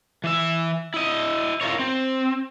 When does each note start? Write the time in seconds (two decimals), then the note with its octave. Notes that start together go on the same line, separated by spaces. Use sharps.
0.24 E3 E5
0.94 E4 D#5
1.61 E4 F4 A#4 C#5
1.79 C4